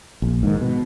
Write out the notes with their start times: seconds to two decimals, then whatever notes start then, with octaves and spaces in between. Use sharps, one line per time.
0.22 A#1
0.43 G#2 D#3
0.61 B2